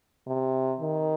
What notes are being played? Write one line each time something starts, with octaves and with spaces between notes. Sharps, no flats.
C3
D#3